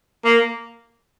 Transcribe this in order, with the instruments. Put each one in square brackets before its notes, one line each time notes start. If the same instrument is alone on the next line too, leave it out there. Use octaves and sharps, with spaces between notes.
[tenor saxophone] A#3